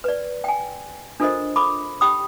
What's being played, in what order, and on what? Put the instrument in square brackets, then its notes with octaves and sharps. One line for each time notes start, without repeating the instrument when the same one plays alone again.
[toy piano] B4 D5
G5 G#5
D4 F4 A4 A#4 C5 D#5
A4 B5 D6
G4 G5 B5 D#6